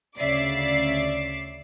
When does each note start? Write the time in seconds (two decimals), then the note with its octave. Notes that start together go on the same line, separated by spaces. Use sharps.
0.17 D2 C#3 D5 E5 D6 C7